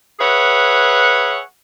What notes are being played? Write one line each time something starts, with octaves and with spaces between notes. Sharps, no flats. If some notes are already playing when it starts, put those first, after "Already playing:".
G#4 B4 C#5 E5 F#5